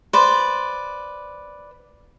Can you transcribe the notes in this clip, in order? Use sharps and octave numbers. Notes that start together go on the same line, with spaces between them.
B4 C5 D5